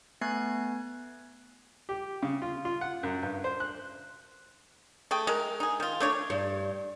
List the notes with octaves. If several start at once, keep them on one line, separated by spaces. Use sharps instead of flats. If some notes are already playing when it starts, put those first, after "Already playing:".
A3 B3 G#5 F#6 G#6 C7
G4
C#3
F4
F4
F#5
F#2
G2
C5
F#6
A3 G#4 G5
G#3 A#4
D#4 G#4
D#3 F4
A3 D4 C#5
G2